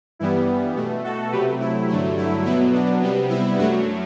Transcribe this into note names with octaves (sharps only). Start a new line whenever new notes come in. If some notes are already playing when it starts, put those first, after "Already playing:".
G2 E3 G3 B3 E4
B2 A3
F#4 A4
C3 F#3 A3 G4 B4
E4
G2 D3 F#3 A3
E4
B2 F#3 B3 E4
D4
C3 G3 B3
E4
F#2 F#3 A3 D4 F#4